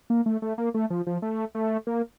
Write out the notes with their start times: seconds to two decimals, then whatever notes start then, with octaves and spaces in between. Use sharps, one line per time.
0.10 A#3
0.26 A3
0.42 A3
0.58 A#3
0.74 A3
0.90 F3
1.07 F3
1.22 A3
1.55 A3
1.87 A#3